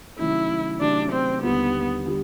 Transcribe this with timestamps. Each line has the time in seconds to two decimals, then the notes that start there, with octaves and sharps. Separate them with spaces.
0.19 C3 D#3 F#3 A3 C#4 E4
0.80 C3 D#3 F#3 A3 C#4 D4
1.12 C4
1.42 D#2 D3 G3 B3
2.06 D3 G3